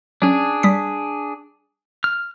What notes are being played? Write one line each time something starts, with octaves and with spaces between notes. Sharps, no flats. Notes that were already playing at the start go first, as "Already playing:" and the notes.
F#3 C#4 D4 G#4
G3 D#6 B6
F6